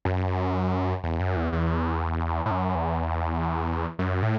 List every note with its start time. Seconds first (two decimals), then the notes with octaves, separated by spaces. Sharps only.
0.05 F#2
1.04 E2
1.20 F#2
1.36 E2
1.52 E2
2.46 A2
2.51 F#2
2.75 E2
3.99 F#2
4.22 A2